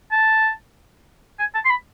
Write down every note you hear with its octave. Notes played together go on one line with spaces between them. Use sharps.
A5
G#5
A5
C6
B5